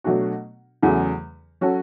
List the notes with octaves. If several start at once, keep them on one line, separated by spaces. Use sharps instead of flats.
B2 F#3 A3 D4 F#4
E2 C#3 F#3 A3
F#3 C#4 F#4 A4